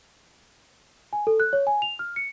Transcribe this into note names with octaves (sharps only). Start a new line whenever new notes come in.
G#5
A4
F#6
C#5
G#5
F7
F6
C#7